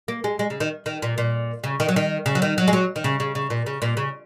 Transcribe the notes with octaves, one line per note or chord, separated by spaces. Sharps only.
A#3
G#3
G#3
C#3
D#3
D#3
A#2
A#2
C#3
D#3
F#3
D#3
C#3
F#3
D#3
F#3
G#3
F#3
D#3
C#3
C#3
C#3
A#2
C#3
A#2
C#3